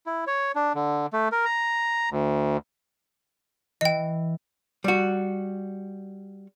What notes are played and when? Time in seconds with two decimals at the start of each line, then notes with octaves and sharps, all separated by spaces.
0.06 E4
0.27 C#5
0.55 D4
0.75 D3
1.13 A3
1.32 A#4
1.45 A#5
2.11 D2
3.81 E3 D#5 G5
4.84 G3 F#4